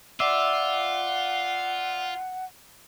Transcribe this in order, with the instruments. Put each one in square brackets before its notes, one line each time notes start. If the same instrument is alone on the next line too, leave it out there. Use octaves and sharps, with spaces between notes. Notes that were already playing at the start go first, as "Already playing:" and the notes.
[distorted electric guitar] F4 [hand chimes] D5 D6 [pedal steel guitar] E5 [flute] F#5